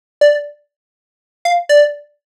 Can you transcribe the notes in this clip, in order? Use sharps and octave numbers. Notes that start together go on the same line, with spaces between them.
D5
F5
D5